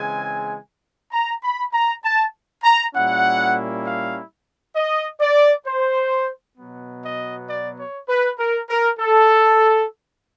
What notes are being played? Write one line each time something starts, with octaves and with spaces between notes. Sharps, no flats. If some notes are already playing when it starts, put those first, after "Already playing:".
Already playing: C#3 E3 G#3 C4 G#5
A#5
B5
A#5
A5
A#5
A#2 G3 A#3 C#4 E4 F#5
F5
D#5
D5
C5
B2 F#3 B3
D#5
D5
C#5
B4
A#4
A#4
A4